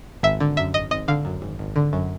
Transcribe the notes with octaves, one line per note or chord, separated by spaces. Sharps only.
G#1 E5
D3
F#2 E5
G#1 D#5
G#1 D#5
D3 F5
F#2
G#1
G#1
D3
F#2